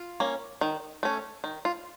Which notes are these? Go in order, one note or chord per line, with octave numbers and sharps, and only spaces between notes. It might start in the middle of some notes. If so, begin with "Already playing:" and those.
Already playing: F4
A#3 C#4
D#3
A3 C#4
D#3
F4